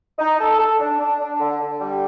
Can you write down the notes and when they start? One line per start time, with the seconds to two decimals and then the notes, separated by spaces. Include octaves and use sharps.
0.19 D#4
0.39 A4
0.59 A4
0.79 D4
0.99 D4
1.20 D4
1.40 D3
1.60 D3
1.80 G3